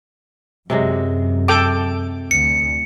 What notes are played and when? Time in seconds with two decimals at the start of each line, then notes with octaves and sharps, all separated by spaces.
0.70 F#2 C3 F#3 G#3
1.48 A4 G5 D6
2.31 D2 C#7